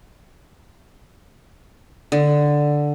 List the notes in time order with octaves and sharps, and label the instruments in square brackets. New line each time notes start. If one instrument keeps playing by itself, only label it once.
[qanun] D3